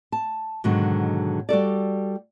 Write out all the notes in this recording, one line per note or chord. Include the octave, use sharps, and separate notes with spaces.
A5
G#2 B2 D3 D#3 F#3
G3 F#4 A4 D5